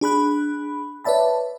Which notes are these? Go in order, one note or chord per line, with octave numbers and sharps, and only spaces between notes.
D4 G#4 B5 F#6
B4 C#5 D5 E5 A5 B5